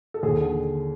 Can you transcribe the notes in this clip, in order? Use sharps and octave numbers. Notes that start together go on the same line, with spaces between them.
A4
D#2 G#4
D3